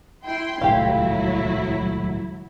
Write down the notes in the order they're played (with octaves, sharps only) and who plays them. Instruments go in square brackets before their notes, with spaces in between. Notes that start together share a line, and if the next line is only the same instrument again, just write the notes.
[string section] E4 G5 C6
[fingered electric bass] D#1 C#2 A2 [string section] F#3 E4 [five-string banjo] G4 F5